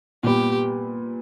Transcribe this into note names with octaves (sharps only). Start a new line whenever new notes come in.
A#2 G3 B3 G4